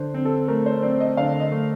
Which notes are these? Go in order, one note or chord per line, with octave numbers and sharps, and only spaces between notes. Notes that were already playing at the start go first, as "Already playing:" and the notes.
Already playing: D3 C5
C4
A4
A3 A#4
C5
C4 D5
D#5
D3 F5
D#5
A3